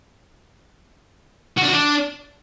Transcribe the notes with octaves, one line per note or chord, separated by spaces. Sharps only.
F#4
D4
F#4
D4